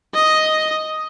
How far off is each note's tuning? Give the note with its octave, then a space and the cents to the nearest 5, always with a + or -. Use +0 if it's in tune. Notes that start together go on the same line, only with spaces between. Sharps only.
D#5 +5